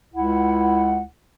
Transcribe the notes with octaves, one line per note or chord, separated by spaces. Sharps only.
C#2 E4 F#5